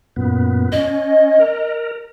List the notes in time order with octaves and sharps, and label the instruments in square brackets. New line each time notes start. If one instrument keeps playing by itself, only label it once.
[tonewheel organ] F#2 A#2 B3
[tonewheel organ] C#4 [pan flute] D#5
[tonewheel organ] A#4